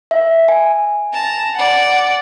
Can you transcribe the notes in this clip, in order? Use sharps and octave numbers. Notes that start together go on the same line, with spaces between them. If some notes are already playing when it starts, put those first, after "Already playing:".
E5
G#5
A5 A#5
D5 F#5